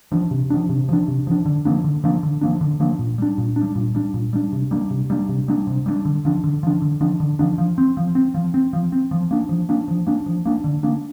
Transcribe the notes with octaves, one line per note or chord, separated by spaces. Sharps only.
F3 D4
C3
F3 D4
C3
F3 D4
C3
F3 D4
D3
F3 A#3 D4
D3
F3 A#3 D4
D3
F3 A#3 D4
D3
F3 A#3 D4
A#2
G3 D4
A#2
D4
G3
A#2
G3 D4
A#2
G3 D4
C3
G3 A#3 D4
C3
G3 A#3 D4
C3
G3 A#3 D4
C3
G3 A#3 D4
D3
F3 D4
D3
F3 D4
D3
F3 D4
D3
F3 D4
F3
C4
F3
C4
F3
C4
F3
C4
F3
A#3 D4
F3
A#3 D4
F3
A#3 D4
F3
A#3 D4
D3
A#3 D4